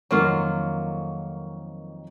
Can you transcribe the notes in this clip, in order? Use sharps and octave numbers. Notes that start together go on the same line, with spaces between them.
F2 D#3 F#3 A#3 F4 C#6